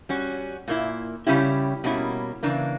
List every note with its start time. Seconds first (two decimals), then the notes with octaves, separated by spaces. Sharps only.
0.09 G3 C#4 F#4
0.68 A#2 A#3 E4
1.27 C#3 G3 C#4 E4 G4
1.84 B2 G3 A#3 C#4 E4
2.43 C#3 E3 A#3 D4